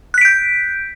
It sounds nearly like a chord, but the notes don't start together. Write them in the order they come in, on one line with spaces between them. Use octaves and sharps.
F#6 B6 D7 G6